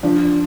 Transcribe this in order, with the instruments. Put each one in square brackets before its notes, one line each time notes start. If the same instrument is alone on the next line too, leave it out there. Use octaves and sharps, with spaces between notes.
[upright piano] F3 [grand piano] D4